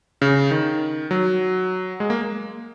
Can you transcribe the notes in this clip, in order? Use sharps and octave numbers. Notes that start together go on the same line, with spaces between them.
C#3
D#3
F#3
G#3
A#3